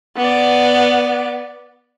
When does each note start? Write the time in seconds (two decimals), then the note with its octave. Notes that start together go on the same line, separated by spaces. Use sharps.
0.16 B3 D5